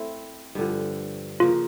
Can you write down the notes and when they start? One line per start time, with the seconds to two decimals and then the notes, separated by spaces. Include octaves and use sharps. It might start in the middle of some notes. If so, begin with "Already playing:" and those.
Already playing: A3 C4 E4
0.55 G2 D3 F3
1.40 C#3 F3 A#3 F4